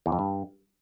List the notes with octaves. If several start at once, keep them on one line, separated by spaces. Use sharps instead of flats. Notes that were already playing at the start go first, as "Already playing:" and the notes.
E2
F2
G2